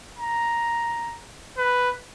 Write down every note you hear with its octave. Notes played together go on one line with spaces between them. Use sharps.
A#5
B4